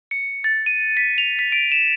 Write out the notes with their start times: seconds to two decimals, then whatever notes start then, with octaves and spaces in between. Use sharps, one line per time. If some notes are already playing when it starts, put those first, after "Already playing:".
0.11 C#7
0.44 A6
0.66 D#7
0.97 B6
1.18 F7
1.39 B6
1.52 D7
1.72 E7